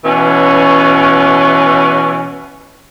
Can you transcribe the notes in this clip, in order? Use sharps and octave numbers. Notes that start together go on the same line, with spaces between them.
B2 E3 C#4